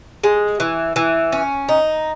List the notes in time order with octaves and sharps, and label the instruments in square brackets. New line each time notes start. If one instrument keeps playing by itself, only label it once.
[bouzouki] G#3
E3
E3
C#4
D#4